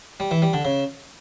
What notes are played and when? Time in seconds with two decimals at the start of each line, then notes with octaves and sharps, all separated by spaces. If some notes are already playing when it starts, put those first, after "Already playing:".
0.20 G3
0.31 E3
0.42 G3
0.53 D3
0.65 C#3